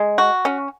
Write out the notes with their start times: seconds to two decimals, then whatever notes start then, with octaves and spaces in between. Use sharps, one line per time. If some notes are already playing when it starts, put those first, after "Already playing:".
Already playing: G#3
0.18 F#4
0.45 C#4